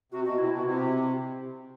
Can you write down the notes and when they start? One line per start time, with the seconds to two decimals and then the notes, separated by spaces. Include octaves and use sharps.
0.12 C3 F#4
0.24 B2 F#4
0.38 C3 E4
0.51 B2 F#4
0.64 C3 E4
0.77 G4